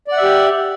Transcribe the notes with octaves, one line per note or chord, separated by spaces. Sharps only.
G4 D5 E5 F#5